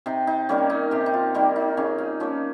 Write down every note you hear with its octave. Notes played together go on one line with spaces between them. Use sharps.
C3 D#4
D#4
D#3 G3 A#3 C#4
D#4
C3 G4
D#4
F4
D#3 G3 A#3 D#4
D#4
C#3 C#4
D#4
F3 A#3 C#4